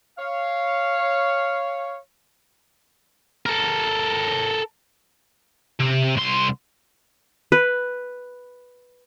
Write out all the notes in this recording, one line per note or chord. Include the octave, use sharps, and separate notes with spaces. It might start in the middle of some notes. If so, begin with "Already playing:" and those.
C#5 F5
A4 A#4
C3
C2 C6
B4